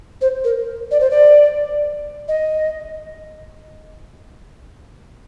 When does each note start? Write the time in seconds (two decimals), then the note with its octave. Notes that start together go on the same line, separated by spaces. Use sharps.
0.21 C5
0.44 A#4
0.91 D5
1.00 C5
1.11 D5
2.28 D#5